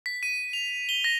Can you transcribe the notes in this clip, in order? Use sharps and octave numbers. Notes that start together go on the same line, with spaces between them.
B6
D#7
F7
G7
A#6